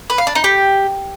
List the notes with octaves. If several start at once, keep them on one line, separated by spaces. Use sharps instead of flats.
B4
F5
D4
D#4
G4